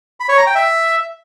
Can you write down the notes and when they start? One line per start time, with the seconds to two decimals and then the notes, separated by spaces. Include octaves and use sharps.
0.20 B5
0.29 C#5
0.38 A#5
0.47 G5
0.55 E5